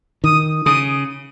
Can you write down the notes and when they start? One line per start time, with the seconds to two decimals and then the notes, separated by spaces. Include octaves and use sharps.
0.24 D#3 D#6
0.65 C#3 D#6